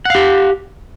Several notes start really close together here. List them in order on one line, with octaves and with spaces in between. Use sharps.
F#5 F5 G4